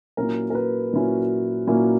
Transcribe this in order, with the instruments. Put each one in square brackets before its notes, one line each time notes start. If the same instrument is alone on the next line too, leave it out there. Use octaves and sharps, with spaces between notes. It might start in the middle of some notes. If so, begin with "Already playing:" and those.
[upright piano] A#2 F#3 A#3 C#4 E4 A#4
A#4
B4
A#2 F#3 A#3 C#4 E4
A#2 F#3 A#3 C#4 E4